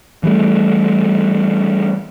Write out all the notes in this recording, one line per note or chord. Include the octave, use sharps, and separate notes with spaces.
E3 G3 A3